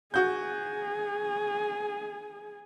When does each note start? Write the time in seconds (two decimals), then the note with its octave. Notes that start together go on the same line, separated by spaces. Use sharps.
0.14 F#4 G#4 G6